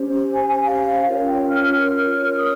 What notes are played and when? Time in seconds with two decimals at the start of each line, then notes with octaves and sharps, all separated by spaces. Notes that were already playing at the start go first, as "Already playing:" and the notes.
Already playing: C#4 G4 C5
0.33 G#5
0.49 G#5
0.63 F5
1.06 C#4 F4 A#4 C#5 F5
1.28 G5
1.50 F6
2.37 D#6